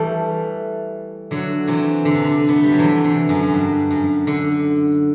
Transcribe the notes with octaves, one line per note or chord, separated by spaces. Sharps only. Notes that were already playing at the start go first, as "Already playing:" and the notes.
Already playing: E3 G3 A3
D3 F#3
C3 E3
D3
C3
D3
B3
A3
G3
F#3
C3 E3
D3
F#2
F#2
G2
F#2
D3